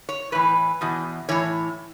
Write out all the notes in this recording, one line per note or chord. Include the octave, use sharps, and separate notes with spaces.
C#5
A2 E3 B4
E2 B2
A2 E3 C#5